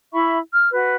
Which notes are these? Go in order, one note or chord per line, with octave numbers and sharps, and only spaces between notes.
E4 E5 B5 C#6
F6
F#4 B4